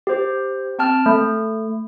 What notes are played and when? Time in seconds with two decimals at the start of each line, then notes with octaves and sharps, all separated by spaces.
0.07 G4 C5
0.79 C4 G5 A5 F6
1.06 A3